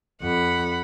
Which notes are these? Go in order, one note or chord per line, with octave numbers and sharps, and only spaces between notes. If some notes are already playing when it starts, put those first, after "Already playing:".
F2 F#5 B5